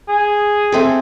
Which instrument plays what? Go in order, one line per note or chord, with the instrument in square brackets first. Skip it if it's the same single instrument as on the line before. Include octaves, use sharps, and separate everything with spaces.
[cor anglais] G#4
[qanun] A3 C4 A4